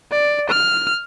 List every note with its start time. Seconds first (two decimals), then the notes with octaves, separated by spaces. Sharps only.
0.11 D5
0.50 F6